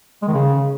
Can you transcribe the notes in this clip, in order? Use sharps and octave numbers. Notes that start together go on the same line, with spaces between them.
G#3
D#3
C#3